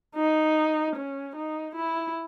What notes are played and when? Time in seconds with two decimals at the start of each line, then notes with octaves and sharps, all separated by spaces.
0.15 D#4
0.96 C#4
1.36 D#4
1.76 E4